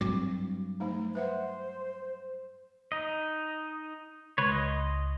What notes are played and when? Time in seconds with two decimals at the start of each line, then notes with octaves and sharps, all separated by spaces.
0.01 G2 F#3 C4 F#4 D6
0.80 F3 A3 D#4
1.15 B4 C5 E5 F#5
2.92 D#4 D#5
4.38 C#2 B4 C#5 C6
4.52 D#5